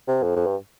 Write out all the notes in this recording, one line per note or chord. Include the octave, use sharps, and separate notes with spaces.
C3
F2
F2
G2